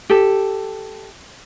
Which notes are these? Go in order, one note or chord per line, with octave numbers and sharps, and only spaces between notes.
G4 A4